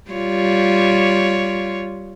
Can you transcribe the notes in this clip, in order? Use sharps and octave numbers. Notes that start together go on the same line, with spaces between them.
G3 F4 C#5